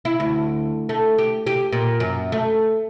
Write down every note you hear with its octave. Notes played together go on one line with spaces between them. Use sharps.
E4
D2
A3
G4
G4
A#2
F#2
A3